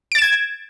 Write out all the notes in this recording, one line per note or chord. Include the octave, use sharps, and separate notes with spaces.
G#6 A6 D7 E7